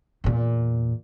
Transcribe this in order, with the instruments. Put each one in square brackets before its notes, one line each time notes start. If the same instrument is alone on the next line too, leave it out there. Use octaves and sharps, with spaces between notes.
[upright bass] E2 A#2